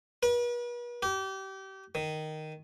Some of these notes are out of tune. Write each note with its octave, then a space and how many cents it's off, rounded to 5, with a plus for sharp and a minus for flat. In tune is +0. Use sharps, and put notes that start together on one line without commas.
B4 -40
G4 -30
D#3 -5